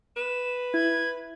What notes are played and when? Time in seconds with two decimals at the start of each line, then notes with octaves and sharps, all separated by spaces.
0.16 B4 E7
0.74 E4 G#6